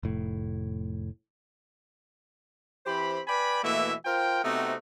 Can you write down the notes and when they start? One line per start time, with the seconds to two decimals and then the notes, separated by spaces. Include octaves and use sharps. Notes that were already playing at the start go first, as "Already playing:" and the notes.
0.03 F1 A2
2.86 E3 C4 G4 C5 B5
3.28 B4 D5 G5 G#5 B5
3.63 B2 E3 A3 A#3 E4 E5
4.05 F4 A#4 C5 G5
4.44 C3 A3 B3 C4 D#4 F#4